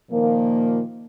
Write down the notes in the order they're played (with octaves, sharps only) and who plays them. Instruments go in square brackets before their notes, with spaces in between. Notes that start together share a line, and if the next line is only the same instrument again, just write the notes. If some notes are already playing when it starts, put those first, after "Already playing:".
[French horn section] A#2 D#3 F3 A#3